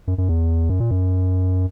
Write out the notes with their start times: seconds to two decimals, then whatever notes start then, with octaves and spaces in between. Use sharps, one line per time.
0.08 F#2
0.18 F#2
0.29 E2
0.69 F#2
0.80 A#2
0.91 F#2